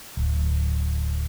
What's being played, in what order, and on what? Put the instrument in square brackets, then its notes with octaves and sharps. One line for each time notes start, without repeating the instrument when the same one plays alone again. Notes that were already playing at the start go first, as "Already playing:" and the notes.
[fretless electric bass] D1